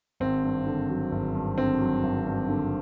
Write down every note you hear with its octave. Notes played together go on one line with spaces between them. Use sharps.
G#1 C4
G2
D3
F#3
G#1
G2
D3 C4
F#3
G#1
G2
D3